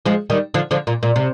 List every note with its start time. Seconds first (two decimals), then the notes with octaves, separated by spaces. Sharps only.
0.06 F3 G#3
0.30 D#3 G3
0.54 D3 F3
0.71 D3 F3
0.87 A#2
1.03 A#2
1.16 C3